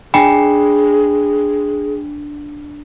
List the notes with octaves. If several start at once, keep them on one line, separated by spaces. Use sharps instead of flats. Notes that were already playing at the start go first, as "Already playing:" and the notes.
D4 G#4 G5 G#5 B5